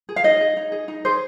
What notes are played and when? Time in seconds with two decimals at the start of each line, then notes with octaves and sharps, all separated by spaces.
0.09 G#4
0.16 F5
0.24 D#4 D#5
0.41 G#4
0.57 D#4
0.72 G#4
0.88 D#4
1.05 G#4 C5